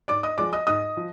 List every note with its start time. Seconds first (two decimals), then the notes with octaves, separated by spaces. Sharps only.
0.08 G#2 D5 D6
0.23 D#5 D#6
0.38 F3 G#3 D5 D6
0.53 D#5 D#6
0.67 G#2 D#5 D#6
0.97 F3